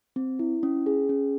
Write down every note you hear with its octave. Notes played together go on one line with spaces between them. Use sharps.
C4
E4
C#4
G#4
C#4